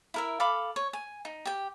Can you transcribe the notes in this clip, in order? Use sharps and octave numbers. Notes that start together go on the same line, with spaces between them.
E4 A#4 E5
A4 F5 B5 D6
C#5
G#5
D#4
G4 G5